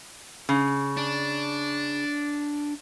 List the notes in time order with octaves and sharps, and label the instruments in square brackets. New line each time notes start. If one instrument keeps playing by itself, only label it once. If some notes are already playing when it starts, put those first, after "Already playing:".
[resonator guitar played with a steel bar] C#3
[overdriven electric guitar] D4